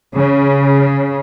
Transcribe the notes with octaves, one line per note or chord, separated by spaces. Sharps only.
C#3